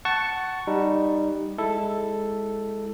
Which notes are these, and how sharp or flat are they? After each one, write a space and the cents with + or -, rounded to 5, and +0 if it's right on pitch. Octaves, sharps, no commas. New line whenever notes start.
F#5 +15 A5 +0 C#6 +0
G3 +0 D#4 -10
G#3 -10 E4 +0 A4 +0